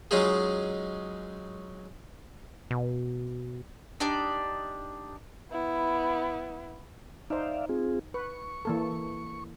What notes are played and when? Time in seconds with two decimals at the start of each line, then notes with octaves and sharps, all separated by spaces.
0.11 F#3 G#3 C#4 D#4 F4 G#4
2.71 B2
4.00 D4 D#4 G4 D5
5.51 B3 E4
7.30 D#4 C5 D5 E5 F5
7.69 C4 F4 G#4
8.14 B4 C#6
8.65 E3 A#3 A4